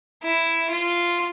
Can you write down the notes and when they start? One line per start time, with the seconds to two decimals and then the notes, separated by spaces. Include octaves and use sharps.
0.24 E4
0.70 F4